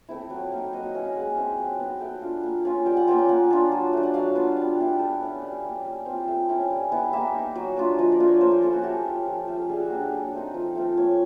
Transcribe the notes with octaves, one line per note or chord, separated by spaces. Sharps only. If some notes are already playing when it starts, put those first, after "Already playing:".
A3 C4 E4
F#3
A#3 D#4
F#3 D#5
D#5
A#3 C#4 E4 D#5
F5
G#3 F#5
C4 E4
F#3
B3 D#4
A3 G5
D4 F4
A#3
C#4 F4
G3 G5
F#5
A#3 C#4 F4 G5
G5
A#3 F#5
D4 F4
F#3
A3 D4
F#5
F#3 F5
B3 D4 F4
G3
B3 E4
A3
C#4 E4
G3
A#3 C#4
G3
C4 F4
A3
C#4 E4
G3
B3 E4
A#3 E5
D#4
F#3
A#3 D4 F4
F3 D#5
D5
A3 D4 F4
C#5
A#3 C5
A#4
C#4 E4 A4
F#4
A3 G4
C#4 F4
F3
A3 C#4
G3 G#4
F#4
A#3 D4 F#4
G4
F#3 A4
A3 C4 D#4
F3
A3 C4 F4
A#3 C#5